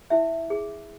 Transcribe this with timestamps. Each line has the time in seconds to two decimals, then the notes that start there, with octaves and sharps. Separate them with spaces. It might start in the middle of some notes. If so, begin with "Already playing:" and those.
0.10 E4 E5
0.50 G#4